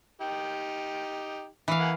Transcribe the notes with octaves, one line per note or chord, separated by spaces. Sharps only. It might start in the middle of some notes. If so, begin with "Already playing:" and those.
D#4 G4 G5
E3 F5
A#3 F#5 G#5